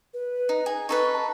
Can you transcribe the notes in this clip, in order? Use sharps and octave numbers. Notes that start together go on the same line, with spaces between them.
B4
D#4
G#4
D#4 A4 B4 C#6
A5